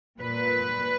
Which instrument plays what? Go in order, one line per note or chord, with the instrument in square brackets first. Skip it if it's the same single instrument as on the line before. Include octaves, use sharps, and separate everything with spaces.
[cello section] A#2 B4